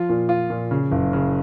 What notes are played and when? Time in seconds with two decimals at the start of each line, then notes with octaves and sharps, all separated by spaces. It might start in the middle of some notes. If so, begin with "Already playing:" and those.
Already playing: F3 F4
0.09 A#2
0.29 F4
0.50 A#2
0.71 C#3
0.92 F#1
1.13 C#3